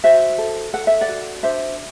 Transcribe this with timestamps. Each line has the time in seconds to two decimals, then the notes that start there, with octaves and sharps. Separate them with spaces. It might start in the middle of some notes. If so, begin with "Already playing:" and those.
0.04 F#4 C5 E5
0.38 A4
0.73 A4 F#5
0.87 E5
1.01 D5 F#5
1.09 F#4
1.43 D4 C5 E5